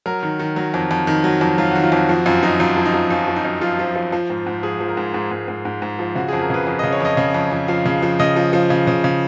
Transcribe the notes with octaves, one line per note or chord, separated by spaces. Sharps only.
F#3 A#4
D#3
D#3
F#3
F2
F2
D#3
F#3
F2
F#3 F4
F#4
D#3
F4
F2 F#4
F3 F#4
F#2 F4
F3 D#4
F#2 F4
F3
D#4
F3
F#2 F4
F3
D#4
F#2
F3 F4
F3
F3
F3
G#2
G#2
F3 G#4
F3
A#4
G#2
G#2 G#4
G#2
G#2
G#2
G#2
F3
C#3 F#4
G#4
F2
A#4
C#3 B4
F2
D#5
C#3
C#5
F2 D#5
C#3
F2
F2
F3 F5
C#3
F3
C#3 D#5
F3
F3
C#3
C#3
C#3